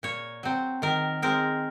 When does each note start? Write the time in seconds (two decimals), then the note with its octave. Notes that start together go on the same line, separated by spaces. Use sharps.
0.03 A#2 C#5
0.43 F#3 C4
0.82 D#3 A#4
1.22 G#3 C4 A#4